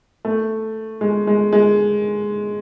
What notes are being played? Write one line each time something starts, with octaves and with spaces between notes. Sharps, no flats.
A3
G#3
G#3
G#3